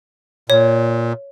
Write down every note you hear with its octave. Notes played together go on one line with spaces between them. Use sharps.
A#2 C#5